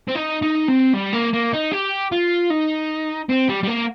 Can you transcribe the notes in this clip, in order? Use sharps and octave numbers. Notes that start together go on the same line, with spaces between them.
C4
D#4
D#4
C4
G3
A#3
A#3
D#4
G4
F4
D#4
C4
G3
G3
A#3